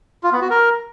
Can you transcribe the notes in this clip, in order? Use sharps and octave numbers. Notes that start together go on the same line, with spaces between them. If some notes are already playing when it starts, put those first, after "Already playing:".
F4
B3
F#4
A#4